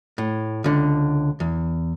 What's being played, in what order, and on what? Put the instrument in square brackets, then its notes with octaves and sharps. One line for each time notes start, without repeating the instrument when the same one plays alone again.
[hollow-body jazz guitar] A2
C#2 D3
E2